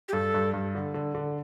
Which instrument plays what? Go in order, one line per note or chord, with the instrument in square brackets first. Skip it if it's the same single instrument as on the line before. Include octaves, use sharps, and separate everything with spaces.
[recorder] G4
[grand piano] G2 [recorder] A4
[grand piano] G2
G2
D3
D3
D3